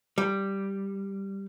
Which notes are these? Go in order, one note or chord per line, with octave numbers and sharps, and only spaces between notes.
G3